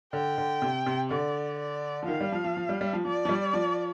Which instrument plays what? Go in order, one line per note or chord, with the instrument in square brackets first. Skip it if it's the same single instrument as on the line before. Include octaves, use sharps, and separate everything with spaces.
[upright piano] D3 [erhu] G5
[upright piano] D3
C3
C3
[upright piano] D3 [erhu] D5
[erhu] D5
[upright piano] F3
[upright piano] D#3 [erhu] F5
[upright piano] G3
F3
F3
F3
G3
G3
F3
[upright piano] F3 [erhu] D5
[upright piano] F3
G3
F3